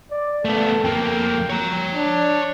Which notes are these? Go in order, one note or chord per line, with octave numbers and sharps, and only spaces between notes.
D5
A3 B3 A4
F2 A#3 G5
C#5 A#5
D4